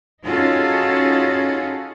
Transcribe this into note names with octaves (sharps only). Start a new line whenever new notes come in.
C#4 D#4 F4 F#4 G#4 A4